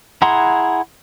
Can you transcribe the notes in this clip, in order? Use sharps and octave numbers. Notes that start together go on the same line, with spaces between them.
E4 G#4 F#5 A#5 C6